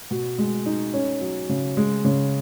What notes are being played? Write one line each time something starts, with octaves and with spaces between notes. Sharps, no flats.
B2
G#3
D#4
C#4
F#3
C#3
G#3
C#3